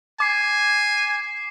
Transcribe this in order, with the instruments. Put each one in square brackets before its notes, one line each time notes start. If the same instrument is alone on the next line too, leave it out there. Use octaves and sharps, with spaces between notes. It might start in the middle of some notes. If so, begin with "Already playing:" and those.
[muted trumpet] G#5 [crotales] D6 C7